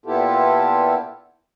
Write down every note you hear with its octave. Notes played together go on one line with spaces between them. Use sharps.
A#2 B3 E4 F4 G4 A4